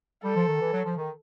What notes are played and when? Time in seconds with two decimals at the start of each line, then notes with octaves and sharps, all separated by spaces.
0.24 G3 A4
0.36 F3
0.48 D#3
0.61 E3
0.73 F#3
0.85 F3
0.97 D#3